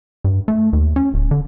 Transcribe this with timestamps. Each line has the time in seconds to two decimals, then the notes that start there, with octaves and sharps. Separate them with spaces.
0.24 G2
0.48 A3
0.73 D#2
0.96 C#4
1.14 D1
1.31 D3